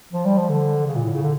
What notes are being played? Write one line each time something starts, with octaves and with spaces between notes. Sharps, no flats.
F3
G3
F3
D3
C#3
A#2
A2
C#3
D3